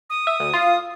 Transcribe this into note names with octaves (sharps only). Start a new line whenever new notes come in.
D#6
E5
D2
F4